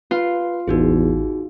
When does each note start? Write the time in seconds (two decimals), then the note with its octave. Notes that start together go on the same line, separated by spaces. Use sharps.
0.11 F4 B4
0.68 A1 E2 D#4 F#4 G#4